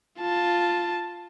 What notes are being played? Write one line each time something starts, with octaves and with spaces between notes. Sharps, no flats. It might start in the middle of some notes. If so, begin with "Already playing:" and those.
F4 A5